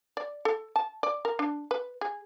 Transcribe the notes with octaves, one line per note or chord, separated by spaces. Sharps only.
D5
A4
A5
D5
A#4
D4
B4
G#4